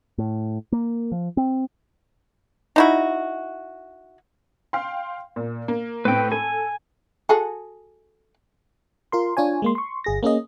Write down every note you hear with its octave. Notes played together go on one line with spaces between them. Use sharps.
A2
A#3
F3
C4
D#4 E4 F#4
F5 G5 C6
A#2
A#3
A2 C4 B4 G5
A4 G#5
F#4 G#4 A4
F4 A#4 C6
D4 F4 C#5 G#5
G#3 A#3 C6
C6 C#6
G1 G#4 A#6
A#3 C#4 G#4 D#5